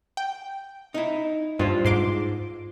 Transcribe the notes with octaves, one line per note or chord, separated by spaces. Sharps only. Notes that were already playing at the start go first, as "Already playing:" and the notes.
G5
D#4 E4
G2 F4 C5
G#2 C6 D6